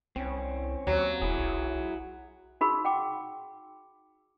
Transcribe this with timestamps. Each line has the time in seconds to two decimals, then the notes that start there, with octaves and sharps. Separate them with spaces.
0.16 C2 C4 C#4
0.87 D#2 F#3
1.22 E1 E4 G#4
1.38 B1
2.61 D#4 F#4 G#4 B5 C#6 E6
2.85 F#5 G5 D6